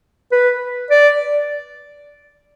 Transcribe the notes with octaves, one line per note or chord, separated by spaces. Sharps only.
B4
D5